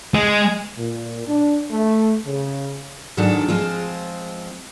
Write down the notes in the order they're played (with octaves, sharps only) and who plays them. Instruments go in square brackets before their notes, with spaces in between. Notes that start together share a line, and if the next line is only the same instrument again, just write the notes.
[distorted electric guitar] G#3
[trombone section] A#2
D4
A3
C#3
[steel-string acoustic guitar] G#2 D#3 F#3 G#3 D4 A4
F3 G#3 C4 F4